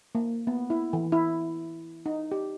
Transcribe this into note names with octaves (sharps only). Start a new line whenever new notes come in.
A#3
B3
E4
E3
E4
D#4
G4